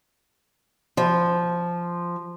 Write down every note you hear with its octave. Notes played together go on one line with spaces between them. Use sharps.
F3